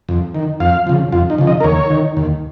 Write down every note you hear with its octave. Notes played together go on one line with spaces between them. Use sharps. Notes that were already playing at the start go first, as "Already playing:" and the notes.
F2
D#3
F2 F5
C#3 F3
F2 F4
D#4
C#3 F3
D#5
A#4
D#2 C#5
D#3
D#2